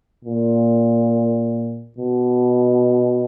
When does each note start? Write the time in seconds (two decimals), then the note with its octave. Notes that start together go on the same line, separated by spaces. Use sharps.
0.24 A#2
1.98 B2